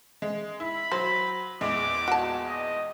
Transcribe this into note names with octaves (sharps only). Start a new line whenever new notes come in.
G#3
E4 B5
F#3 C5
A#1 E2 G#3 D6
F#4 A5
D#5